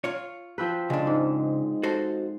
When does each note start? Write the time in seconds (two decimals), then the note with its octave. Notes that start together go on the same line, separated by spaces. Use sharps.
0.04 F4 C#5
0.58 F3 C4 B4
0.90 C#3 G#3 D4
1.07 G#2
1.83 F#4 A4 C5